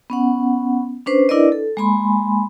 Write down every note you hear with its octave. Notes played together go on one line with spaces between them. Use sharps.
B3 C#4 F#5
C#4 D4 B4 C5
D4 E4 A#4 B4 D5 D#5
A4
G#3 A#3 G#5 B5 C6